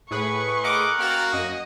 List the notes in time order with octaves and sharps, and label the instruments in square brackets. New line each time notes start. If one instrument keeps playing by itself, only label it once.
[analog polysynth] A2 G#4 B4 [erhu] C#6
[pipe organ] A#4 F#5 [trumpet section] D#5 D6
[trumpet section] A#3 C#4 F#4 [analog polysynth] G5 F6 A6
[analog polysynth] F#2 [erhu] D#5